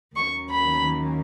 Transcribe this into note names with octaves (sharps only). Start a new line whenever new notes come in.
D#2 D#3 F#3 A#3 C#4 C#6
B5